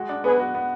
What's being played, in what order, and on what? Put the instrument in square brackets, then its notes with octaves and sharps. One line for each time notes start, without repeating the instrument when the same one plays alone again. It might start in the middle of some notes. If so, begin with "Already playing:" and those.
Already playing: [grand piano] G#3 F#4
D4
[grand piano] B3 [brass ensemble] G#4 B4
[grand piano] F#4
B3